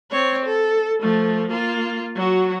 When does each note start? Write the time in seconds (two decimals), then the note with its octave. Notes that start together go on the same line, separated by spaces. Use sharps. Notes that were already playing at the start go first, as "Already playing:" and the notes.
0.11 C4 C#5
0.46 A4
1.02 F3 A3
1.50 A#3 F4
2.16 F#3 F#4